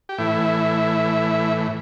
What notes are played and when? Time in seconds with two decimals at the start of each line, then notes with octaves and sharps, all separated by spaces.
0.09 G4
0.18 A2 E3 E4